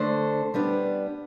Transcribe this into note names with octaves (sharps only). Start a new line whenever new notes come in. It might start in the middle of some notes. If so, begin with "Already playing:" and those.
Already playing: D3 A3 D4 A4 C5
G3 B3 D4